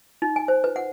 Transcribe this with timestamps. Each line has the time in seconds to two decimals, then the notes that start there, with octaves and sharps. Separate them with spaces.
0.22 D#4
0.36 G#5
0.48 C5
0.64 B4
0.76 F#5